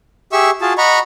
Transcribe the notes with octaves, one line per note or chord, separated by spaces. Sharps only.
G4 G#4 E5 C#6 E6
F4 F#4 G#4 A5
D#5 F#5 A#5 B5 C#6